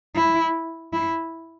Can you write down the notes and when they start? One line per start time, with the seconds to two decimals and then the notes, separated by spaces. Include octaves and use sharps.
0.16 E4
0.93 E4